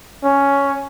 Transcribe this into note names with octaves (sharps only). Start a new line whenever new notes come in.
C#4